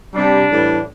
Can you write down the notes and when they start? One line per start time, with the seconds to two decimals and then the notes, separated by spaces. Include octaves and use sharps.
0.13 C3 G3 D4
0.50 A2 E3 G3